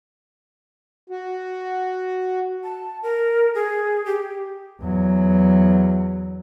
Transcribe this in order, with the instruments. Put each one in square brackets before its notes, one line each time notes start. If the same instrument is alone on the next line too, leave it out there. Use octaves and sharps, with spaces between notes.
[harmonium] F#4
[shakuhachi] A5
A#4
G#4
G4
[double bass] E2 F#3